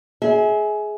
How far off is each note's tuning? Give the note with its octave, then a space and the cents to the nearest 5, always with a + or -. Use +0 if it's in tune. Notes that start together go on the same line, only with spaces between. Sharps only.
G#4 +15 E5 -30